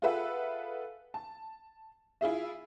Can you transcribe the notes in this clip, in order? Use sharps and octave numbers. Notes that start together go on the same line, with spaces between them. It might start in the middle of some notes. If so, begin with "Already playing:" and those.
F4 G#4 A4 B4 E5 F#5
A5
E4 F4 G#4 E5